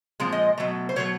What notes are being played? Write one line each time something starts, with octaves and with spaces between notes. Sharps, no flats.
A#2 F3 G#3 C4
D#5
B2 F#3 A3
C5
B2 F#3 A3 C#5